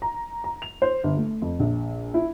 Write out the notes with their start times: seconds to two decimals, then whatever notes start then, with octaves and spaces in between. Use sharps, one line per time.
0.02 A#5
0.44 A#5
0.62 F7
0.82 C5
1.04 G1
1.17 A3
1.42 F2
1.60 A#1
2.14 E4